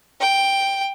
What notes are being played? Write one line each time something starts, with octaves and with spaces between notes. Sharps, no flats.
G5